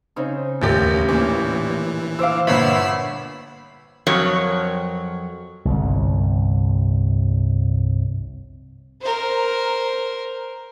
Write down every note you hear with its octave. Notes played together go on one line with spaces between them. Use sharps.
C#3 C4 D#4
A1 D#2 G4 A#4
A#2 E3 C#4 D4
C5 F5 D6 E6
G1 A#2 B4 C#5 F#5 B5 E6 C7
F2 F#3 A#4 C#5
G1 C2
A#4 C5